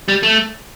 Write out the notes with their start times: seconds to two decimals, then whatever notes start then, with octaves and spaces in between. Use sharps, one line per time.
0.08 G3
0.23 A3